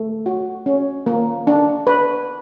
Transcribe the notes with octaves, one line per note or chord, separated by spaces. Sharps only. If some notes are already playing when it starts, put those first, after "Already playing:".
Already playing: A3
F#4
C#4
A#3
D4
B4